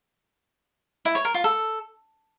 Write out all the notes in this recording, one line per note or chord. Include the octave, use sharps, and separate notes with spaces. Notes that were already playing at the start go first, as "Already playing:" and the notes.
E4
C#5
A#4
F4
A4